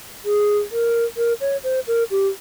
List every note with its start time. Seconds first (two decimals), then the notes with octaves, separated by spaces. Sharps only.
0.25 G#4
0.72 A#4
1.17 A#4
1.41 C#5
1.64 C5
1.87 A#4
2.11 G4